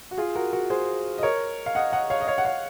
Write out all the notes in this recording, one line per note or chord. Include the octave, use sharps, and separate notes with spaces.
F#4
F4 G#4
F#4 A#4
F#4 A#4
G#4 C5
D#5
A#4 C#5
F5
D#5 F#5
D#5 F#5
C#5 F5
D#5
C#5 F5
F#5
C#5 F5